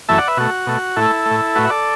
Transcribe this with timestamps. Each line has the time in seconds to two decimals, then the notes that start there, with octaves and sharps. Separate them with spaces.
0.09 F#2 E3 A3 E5 A5
0.18 D5 F#5
0.28 B4 E5
0.37 B2 A3 F#4
0.67 B2 A3
0.96 A2 E4 A4
1.02 A3
1.26 A3
1.31 A2
1.55 A2 A3 F#4 B4
1.65 E5
1.70 A4 D5